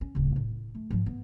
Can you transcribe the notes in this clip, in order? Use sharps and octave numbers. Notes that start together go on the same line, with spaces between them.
C#4
D1 C#3
A2
A3
G#2 F3
B3